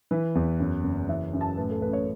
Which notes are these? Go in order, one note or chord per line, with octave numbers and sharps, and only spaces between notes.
E3 B4
E2
F#2
F#1
E3 E5
F#2
A5
A2 B4
A4
A1 B4
C#5